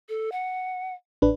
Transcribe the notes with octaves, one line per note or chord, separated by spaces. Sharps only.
A4
F#5
A1 D4 B4